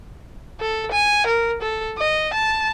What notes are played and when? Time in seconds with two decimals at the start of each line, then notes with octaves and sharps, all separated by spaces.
0.61 A4
0.92 G#5
1.27 A#4
1.62 A4
1.98 D#5
2.34 A5